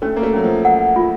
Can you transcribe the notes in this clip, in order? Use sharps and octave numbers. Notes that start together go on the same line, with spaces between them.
A3 C#4
A#3
A3
F#3 C#4
F3
F#5
F4